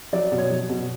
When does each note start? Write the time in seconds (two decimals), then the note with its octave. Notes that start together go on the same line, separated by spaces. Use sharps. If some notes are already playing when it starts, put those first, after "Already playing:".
0.13 F#3 D5
0.32 B2
0.38 C#5
0.50 F#3
0.69 B2